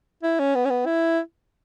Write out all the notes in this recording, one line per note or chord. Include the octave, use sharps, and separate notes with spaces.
E4
C#4
B3
C#4
B3
E4